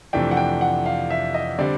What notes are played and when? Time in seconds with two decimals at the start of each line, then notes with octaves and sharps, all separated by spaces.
0.13 F2 C3 E3 A3 D4 G5
0.31 F#5
0.37 G5
0.61 F#5
0.86 F5
1.10 E5
1.34 D#5
1.58 D3 G3 C4 D5